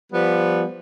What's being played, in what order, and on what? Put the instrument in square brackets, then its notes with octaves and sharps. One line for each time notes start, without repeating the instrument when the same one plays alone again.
[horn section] F3 G3 B3